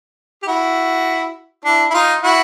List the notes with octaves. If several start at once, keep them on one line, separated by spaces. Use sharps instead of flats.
G4
E4 F#4
D4 E4
E4
D#4 F4
E4 F#4